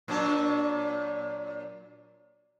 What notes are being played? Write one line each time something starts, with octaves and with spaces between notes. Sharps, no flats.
A#2 F#3 D4